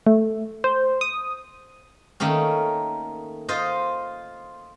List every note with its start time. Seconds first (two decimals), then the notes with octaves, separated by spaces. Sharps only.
0.07 A3
0.64 C5
1.01 D#6
2.20 D#3 A3 A#3 C#4
3.49 F4 C5 D#5